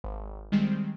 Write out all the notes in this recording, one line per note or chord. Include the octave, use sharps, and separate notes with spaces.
G#1
D#3 G3 G#3 C4